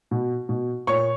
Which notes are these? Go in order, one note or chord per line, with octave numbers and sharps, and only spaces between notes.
B2
B2
A#2 C#5 C#6